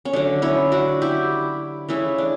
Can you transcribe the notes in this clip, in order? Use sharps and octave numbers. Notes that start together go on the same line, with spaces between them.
C#4
D3 F#3 A3 D4
C#4 E4
D4 F#4
E4 G4
C#3 E3 A3 C#4 E4
D4